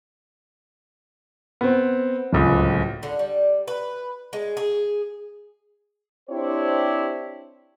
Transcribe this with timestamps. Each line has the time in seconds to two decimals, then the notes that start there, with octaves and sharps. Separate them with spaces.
1.61 B3 C4
2.33 D1 C#2
3.03 D3
3.19 G3
3.68 B4
4.33 G#3
4.57 G#4
6.30 C4 D4 E4 G4 C5 C#5